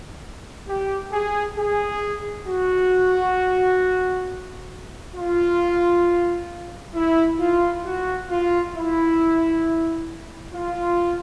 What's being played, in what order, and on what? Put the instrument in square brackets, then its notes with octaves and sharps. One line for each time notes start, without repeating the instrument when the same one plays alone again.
[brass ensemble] G4
G#4
G#4
F#4
F4
E4
F4
F#4
F4
E4
F4